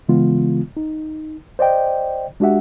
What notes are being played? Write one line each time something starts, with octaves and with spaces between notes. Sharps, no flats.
C#3 E3 G#3 B3 F4
D#4
C5 D5 D#5 G5
G#3 D4 F#4 G4 E5 F#5